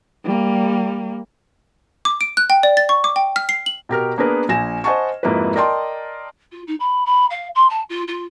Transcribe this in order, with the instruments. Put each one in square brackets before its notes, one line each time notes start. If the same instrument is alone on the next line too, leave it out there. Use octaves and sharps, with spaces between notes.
[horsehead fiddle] G3 A#3
[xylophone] D6
D7
F#6
G5
D5
A6
C#6
D6
G5
F6
C7
F#7
[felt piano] B2 G4 A#4 F6
A#3 B3 D4 G#4 A#4 B4
A#1 G#5 A#6 E7
C5 D#5 F#5 G#5 A5 C#6
F2 G#2 A#3 E4 F#4 B4
A#4 D5 D#5 G5 A5 C6
[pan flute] F4
D#4
B5
B5
F5
C6
A5
F4
F4